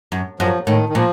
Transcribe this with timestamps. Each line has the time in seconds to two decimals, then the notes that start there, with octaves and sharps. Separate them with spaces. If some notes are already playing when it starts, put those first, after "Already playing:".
0.12 F#2
0.39 F#2 F3
0.67 A2 D#3
0.89 D#3
0.95 A#2 F3